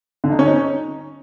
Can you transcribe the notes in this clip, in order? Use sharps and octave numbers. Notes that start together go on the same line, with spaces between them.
D3
D#4
C#4
D#4